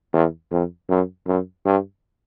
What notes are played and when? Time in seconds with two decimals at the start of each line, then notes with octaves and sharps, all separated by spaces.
0.13 E2
0.51 F2
0.89 F#2
1.27 F#2
1.65 G2